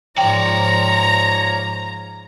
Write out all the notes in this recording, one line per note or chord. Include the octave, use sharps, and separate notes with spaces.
G#2 F3 C#5 D5 G5 A#5